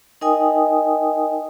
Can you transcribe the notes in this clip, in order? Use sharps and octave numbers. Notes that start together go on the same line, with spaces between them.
D#4 A#4 D#5 G5 G#5 D#6